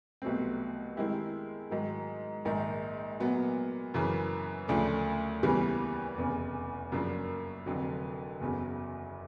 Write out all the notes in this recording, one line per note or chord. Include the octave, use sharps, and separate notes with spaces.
C2 B2 F#3 A3 C4
D#3 G#3 C4 E4 G4
G#2 D#3 F#3
A#1 G#2 D#3
A#2 F#3 B3
F#2 C#3 E3
D2 C#3 F3 A3 D4
E2 C#3 E3 G3 A#3
F1 E2 C#3
F#2 C#3 F3 A#3 D4
F1 F2 D3 F#3
F#1 E2 C#3 F#3